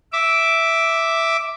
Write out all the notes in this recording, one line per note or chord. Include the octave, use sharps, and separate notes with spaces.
E5 D6